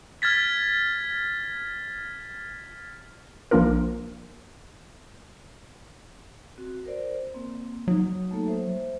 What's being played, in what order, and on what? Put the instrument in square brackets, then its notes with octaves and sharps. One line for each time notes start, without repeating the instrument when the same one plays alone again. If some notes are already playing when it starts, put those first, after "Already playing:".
[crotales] F6 G#6 A6 B6
[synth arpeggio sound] A#1 F3 A#3 D4 F4 A#4
[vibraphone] C4 F#4
A#4 C5 D5
A#3 C4
[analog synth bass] F#3 [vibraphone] D#4
[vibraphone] A3 A#3 A4
C5 E5